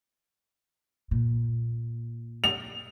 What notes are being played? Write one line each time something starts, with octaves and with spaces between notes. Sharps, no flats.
A#2
F7